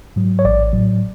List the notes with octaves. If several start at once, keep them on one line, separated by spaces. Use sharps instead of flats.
G#2 F#3
C#5
A1 D5
A2 F#3